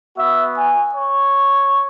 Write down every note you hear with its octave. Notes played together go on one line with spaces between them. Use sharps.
B3 F#4 E5
G#5
C#5